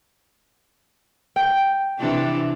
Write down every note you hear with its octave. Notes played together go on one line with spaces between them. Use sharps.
G5
C3 E3 D4